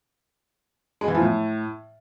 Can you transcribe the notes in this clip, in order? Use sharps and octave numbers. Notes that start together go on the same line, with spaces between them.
G#3
E3
F3
A2